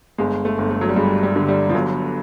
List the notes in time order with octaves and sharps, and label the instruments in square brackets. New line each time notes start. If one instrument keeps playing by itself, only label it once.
[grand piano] G1 [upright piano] G#3
[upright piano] A3
[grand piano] G1
[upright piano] A3
F#3
G3
[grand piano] G2 [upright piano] G#3
[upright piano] G3
[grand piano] D3
[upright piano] G3
F3
[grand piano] G1 [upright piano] F#3